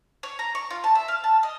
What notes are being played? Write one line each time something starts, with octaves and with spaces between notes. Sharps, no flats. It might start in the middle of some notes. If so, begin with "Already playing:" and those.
C#5
A#5
C#6
F4
A5
E5
F5
A5
D#5